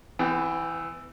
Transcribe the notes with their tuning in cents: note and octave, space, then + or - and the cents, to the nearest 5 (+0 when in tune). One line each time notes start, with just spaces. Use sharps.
E3 +0 B3 +35 G5 +5